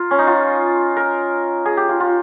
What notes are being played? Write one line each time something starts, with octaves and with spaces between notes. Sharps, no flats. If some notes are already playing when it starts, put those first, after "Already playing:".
Already playing: F4 A#4
C#4
D#4
F4
A#4
G#4
G4
F4
F4